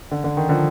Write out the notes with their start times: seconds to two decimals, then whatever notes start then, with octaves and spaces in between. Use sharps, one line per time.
0.11 D3
0.24 D3
0.37 D#3
0.49 D3 F3